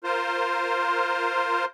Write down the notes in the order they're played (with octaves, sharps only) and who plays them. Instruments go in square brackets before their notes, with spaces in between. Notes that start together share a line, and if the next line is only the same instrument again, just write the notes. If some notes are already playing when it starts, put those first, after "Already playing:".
[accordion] F4 A#4 C5